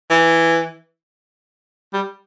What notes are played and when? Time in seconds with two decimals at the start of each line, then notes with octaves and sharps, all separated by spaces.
0.10 E3
1.94 G3